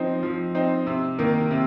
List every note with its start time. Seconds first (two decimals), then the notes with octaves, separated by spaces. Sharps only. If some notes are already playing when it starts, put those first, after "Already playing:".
Already playing: F3 C4 D#4
0.23 F3
0.55 C4 D#4
0.87 C3
1.19 D#3 A#3
1.51 C3